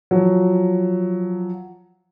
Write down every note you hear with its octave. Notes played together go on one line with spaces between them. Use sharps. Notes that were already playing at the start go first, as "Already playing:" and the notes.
F3 F#3